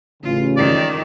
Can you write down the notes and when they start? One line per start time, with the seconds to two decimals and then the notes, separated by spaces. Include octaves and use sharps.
0.23 A1 C#3 F4
0.57 F2 D#3 D5